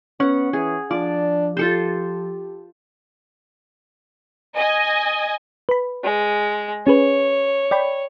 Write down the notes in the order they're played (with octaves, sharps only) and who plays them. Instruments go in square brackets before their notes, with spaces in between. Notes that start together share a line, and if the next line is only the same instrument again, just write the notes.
[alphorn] B3 [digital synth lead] C#4 [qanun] F#5
[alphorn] E3 [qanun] G#4
[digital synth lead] F3 [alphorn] D4 [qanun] D5
[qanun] F4 A4 C5 [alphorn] G4
[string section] D#5 G#5
[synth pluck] B4 B5
[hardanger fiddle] G#3
[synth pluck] C#4 G#4 B4 [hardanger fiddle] C#5
[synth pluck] D5 G5 B5